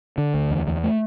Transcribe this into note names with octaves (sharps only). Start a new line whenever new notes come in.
D3
D2
E2
E2
A3